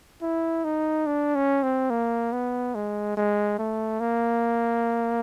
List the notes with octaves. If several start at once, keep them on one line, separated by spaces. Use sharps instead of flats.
E4
D#4
D4
C#4
C4
A#3
B3
G#3
G#3
A3
A#3